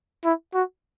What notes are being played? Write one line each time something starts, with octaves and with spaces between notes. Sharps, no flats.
E4
F#4